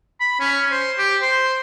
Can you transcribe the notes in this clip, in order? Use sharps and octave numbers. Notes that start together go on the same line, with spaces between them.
B5
C#4
C5
G4
C5